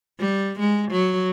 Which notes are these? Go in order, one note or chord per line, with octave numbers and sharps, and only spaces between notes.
G3
G#3
F#3